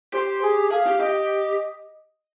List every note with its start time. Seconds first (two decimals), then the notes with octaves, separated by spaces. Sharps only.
0.13 G4 C5
0.42 G#4
0.71 G#4 F5
0.87 G4
1.00 G4 D#5